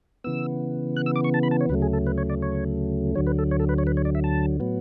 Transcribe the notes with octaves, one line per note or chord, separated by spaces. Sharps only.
C#3 E3 B3 E6
F#6
E6
D6
C#6
A5
B5
A5
C#5
D2 C#3 F#3 A3 B4
G#4
A4
B4
C#5
D5
C#5
D2 D3 F#3 C#5
B4
A4
C#5
A4
B4
C#5
B4
C#5
D5
E5
A5
A2 F#3 B3